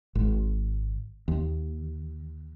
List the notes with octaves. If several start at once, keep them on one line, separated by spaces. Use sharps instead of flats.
G#1
D#2